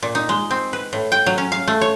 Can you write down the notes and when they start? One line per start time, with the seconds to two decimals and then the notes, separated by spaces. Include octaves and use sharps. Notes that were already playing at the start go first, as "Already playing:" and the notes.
0.03 A#2
0.15 D#4
0.29 G#3
0.51 C4
0.73 B4
0.93 A2
1.12 G5
1.26 F#3
1.38 C#4
1.52 F5
1.68 A3
1.81 C#5